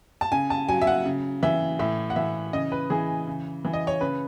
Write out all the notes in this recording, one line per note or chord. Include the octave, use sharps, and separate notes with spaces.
A5
C#3 G#5
A5
F#3 G#5
E5
F#5
C#3
E3 E5
A2 E5
F#5
E3 E5
C#3 D#5
B4
E3 G#4
C#3
E3
D#5
C#5
C#3 B4